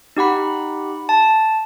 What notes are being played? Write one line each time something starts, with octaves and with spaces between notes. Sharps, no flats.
D#4 G4 F#5 B5
A5